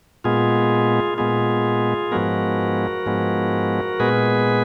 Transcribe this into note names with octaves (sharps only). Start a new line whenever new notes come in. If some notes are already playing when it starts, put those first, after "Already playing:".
A#2 G#3 B3 F4 G#4
A#2 G#3 B3 F4 G#4
G#2 F3 G#3 B3 F#4 A#4
G#2 F3 G#3 B3
A#2 G#3 B3 G#4 B4